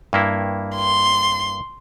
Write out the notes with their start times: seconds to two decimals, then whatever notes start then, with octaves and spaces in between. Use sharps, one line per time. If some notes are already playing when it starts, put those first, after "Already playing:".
0.13 G2 A#3 E4
0.75 C6